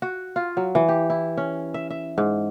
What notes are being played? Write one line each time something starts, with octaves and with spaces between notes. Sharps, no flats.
F#4
F4
F#3
E3
G4
E4
C#4
E5
E5
G#2